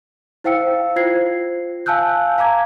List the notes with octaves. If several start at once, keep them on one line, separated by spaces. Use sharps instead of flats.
E4 C5 F5 G5 E6 C#7
F4 C5 G#6 C7
F5 G#5 A5 E6 F#6 G6
F5 A#5 D6 G#6